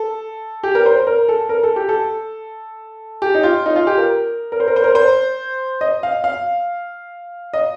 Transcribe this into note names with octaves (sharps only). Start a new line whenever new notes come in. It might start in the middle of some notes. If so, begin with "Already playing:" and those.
Already playing: A4
G4
A#4
C5
A#4
A4
A#4
A4
G4
A4
G4
D#4
F4
D#4
F4
G4
A#4
A#4
C5
A#4
C5
A#4
C5
D#5
F5
F5
D#5